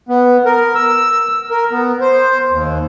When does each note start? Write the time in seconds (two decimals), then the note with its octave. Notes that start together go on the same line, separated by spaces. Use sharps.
0.09 B3
0.46 A#4
0.75 E6
1.51 A#4
1.72 B3
2.01 C5
2.51 D#2